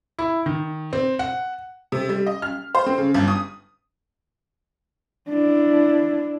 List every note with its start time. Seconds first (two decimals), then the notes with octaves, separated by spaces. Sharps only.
0.19 E4
0.46 D#3
0.93 C4
1.19 F#5
1.92 C3
2.09 G3
2.26 D#5
2.42 F6
2.75 C5
2.86 C4
2.98 C#3
3.14 G1
3.28 D#6
5.29 D4 E4